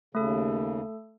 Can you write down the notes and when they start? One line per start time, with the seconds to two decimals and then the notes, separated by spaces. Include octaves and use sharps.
0.15 D#2 C#3 A3 A4